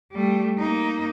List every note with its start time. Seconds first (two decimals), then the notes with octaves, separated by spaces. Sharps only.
0.12 G3 A3
0.58 A#3 D#4